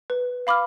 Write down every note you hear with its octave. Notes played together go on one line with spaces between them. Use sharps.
B4
F5 B5 D6 F6